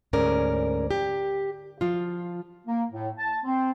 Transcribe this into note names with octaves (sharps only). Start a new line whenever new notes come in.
D2 G#2 C#4 A#4 D5
G4
F3 F4
A#3
A2
A5
C4